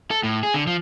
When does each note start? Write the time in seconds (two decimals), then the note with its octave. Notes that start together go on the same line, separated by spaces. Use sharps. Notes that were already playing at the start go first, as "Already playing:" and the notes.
0.11 A4
0.23 A2
0.43 G#4
0.54 D3
0.67 F3